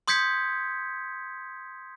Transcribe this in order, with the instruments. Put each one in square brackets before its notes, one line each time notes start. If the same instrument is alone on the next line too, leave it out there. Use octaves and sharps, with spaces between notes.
[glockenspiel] C6 D#6 G6 G#6 B6 C#7